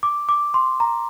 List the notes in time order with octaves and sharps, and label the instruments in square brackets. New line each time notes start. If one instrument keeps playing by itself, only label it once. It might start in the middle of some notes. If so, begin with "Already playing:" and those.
[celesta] D6
D6
C6
A#5